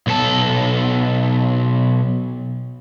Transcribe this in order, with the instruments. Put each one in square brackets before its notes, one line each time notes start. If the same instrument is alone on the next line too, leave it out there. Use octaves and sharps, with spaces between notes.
[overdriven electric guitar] B1 A4